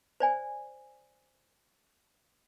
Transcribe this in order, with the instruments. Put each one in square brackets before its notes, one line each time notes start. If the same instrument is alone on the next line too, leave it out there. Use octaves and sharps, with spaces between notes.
[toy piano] C5 D5 G#5